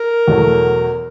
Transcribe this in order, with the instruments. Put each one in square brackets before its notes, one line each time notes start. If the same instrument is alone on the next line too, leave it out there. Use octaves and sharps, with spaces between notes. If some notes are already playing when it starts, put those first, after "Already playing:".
Already playing: [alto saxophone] A#4
[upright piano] E2 B2 F#3 A3